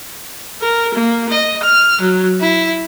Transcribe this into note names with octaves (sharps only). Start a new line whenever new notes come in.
A#4
A#3
D#5
F6
F#3
E4